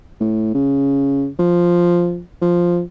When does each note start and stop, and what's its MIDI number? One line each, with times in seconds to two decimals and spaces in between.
0.21 0.54 45
0.55 1.27 49
1.39 2.21 53
2.42 2.81 53